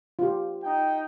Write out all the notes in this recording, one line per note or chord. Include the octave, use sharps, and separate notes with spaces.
F4 G4
D#4 G5